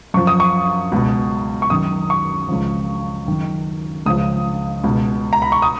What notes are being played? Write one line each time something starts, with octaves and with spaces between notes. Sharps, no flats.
F#2 F3 C#6
D#6
C#6
C#2 B2
C#6
F#2 D#3 D#6
C#6
C#2 C#3 F3
F#2 D#3
C#2 C#3 F3 D#6
C#2 B2
A#5
B5
C#6
D#6